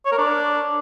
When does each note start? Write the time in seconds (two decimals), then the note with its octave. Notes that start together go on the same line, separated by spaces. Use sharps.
0.06 C#5
0.12 A#4
0.18 D4